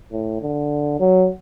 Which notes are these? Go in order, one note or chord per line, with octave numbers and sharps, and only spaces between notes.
A2
D3
F#3